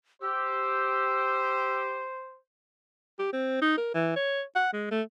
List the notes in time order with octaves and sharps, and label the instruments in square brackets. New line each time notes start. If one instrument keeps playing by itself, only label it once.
[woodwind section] G4 [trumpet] C5 [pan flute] E6
[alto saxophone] G4
C4
D#4
A#4
E3
C#5
F#5
G#3
A3